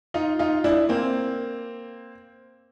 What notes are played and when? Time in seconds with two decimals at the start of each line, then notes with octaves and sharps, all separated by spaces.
0.14 D#4 F4
0.39 D#4 F4
0.64 D4 E4
0.89 A#3 C4